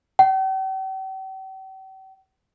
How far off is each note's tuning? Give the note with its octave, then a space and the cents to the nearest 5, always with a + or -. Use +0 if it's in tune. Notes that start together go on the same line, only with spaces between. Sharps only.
G5 -45